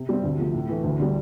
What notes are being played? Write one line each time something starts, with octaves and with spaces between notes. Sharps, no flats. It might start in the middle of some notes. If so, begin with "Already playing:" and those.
Already playing: C3
G3 C4
D2
C3 F3 A3
A2
E3 A3
D2
D3 G3